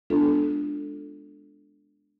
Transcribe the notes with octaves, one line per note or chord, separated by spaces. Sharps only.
G#3 B3 D4 F4 A4